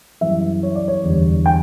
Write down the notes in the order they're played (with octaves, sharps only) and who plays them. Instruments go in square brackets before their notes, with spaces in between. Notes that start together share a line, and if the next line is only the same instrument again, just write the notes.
[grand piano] F#2 E3 G3 E5
C#5
D5
C#5
E2 D3 G3
G5